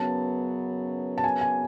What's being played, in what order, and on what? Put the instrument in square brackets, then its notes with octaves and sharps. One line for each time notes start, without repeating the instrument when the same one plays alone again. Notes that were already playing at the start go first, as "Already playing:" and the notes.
Already playing: [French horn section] F#2 C#3 F#3 B3 [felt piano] A5
[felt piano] A5
G#5
G#5